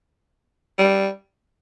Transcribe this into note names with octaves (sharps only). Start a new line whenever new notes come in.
G3